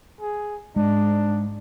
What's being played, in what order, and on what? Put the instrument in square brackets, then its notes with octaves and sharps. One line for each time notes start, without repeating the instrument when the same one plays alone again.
[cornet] G#4
[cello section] G#2 [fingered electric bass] G#3 [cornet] D4